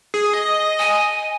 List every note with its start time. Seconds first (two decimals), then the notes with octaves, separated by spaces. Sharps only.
0.14 G#4
0.33 D#5
0.79 G#5